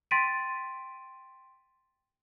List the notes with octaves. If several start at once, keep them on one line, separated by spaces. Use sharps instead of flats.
G5 C6 A6 B6 D7 D#7